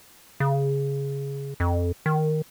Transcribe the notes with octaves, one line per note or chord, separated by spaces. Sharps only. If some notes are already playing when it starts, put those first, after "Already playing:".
C#3
F2
D#3